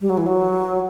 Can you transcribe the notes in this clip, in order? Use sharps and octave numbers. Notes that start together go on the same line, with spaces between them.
G3
F#3
E3
F#3